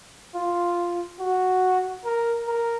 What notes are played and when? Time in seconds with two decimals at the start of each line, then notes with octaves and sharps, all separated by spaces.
0.35 F4
1.20 F#4
2.05 A#4
2.48 A#4